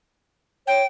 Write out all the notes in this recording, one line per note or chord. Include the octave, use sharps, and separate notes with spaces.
C#5 G5